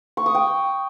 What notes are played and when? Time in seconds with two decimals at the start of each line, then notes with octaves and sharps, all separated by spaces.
0.17 C#6
0.26 D#6
0.35 G5